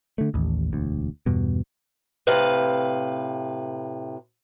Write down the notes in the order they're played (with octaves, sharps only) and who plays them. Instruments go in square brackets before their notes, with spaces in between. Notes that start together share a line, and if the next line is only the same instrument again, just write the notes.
[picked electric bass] D3 A3
A1 D#2
E1 D2
E2 G2 B2
[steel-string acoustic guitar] A2 C3 B4 F5